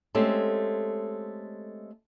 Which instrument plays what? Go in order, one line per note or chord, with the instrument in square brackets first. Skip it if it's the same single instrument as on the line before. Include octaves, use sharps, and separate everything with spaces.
[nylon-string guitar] G#3 A3 C4 C#4 G4 A4